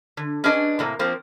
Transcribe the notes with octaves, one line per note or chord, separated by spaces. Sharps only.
D3
C#4 D4 G#4 B4 D5 D#5
A2 C3 A#3
F3 A#3 C4